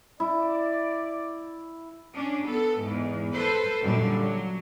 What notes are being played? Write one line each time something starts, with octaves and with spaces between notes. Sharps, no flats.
E4 D5
C#4 D4
B3 A4
E2 G#2
A4 B4 C5
F#2 A#2 D3 G3 D4
F#3